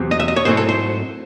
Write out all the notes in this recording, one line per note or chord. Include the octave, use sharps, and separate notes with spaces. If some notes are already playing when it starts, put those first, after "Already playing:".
Already playing: E2 C3 F#3 C4
D#5
E5
D#5
C#5
G#2 F#3 A3 C4 E4 C5
A4
C5